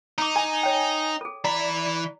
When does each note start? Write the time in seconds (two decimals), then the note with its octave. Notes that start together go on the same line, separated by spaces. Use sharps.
0.18 D#4 A#5 D6
0.36 G#5
0.63 C#5 G5
1.21 G#4 A4
1.44 E3 D5 A#5 B5